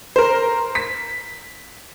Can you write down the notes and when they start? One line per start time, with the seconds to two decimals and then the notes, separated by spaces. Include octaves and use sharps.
0.16 A#4 C5
0.75 B6